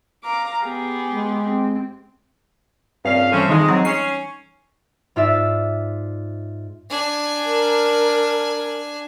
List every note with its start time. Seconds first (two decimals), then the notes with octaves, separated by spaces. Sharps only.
0.23 F5 A#5 D6
0.64 B3 G4 G#4
1.11 G#3
1.47 C4
3.05 G2 A#2 C#3 C4 D5 F5
3.32 E3 G3 A3 C4 C#4 A4
3.49 D#3 F3 G#3 D#4 C6
3.68 F#3 C4 A#5 C#6
3.85 C#4 C7
5.16 G#2 F4 D5 E5
6.89 D4 G#5
7.45 A#4